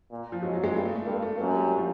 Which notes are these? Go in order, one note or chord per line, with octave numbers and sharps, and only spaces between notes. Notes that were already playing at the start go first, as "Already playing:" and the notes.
A#2
F3
G#2 F#3
F#3
G#3
G2 A3
A3
A3
G2 A#3
A3
F#2 A#3
G3
F3